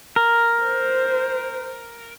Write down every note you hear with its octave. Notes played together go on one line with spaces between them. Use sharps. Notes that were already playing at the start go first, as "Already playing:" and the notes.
A#4
C5